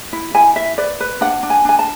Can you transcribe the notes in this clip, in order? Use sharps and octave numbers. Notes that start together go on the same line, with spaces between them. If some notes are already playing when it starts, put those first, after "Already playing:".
E4
E4 G#5
E4 E5
B4 D5
B4
D4 F#5
D4
G#5
D4 G#5
A5